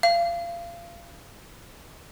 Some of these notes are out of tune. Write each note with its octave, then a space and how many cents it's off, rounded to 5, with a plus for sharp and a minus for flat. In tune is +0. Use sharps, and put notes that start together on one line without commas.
F5 -30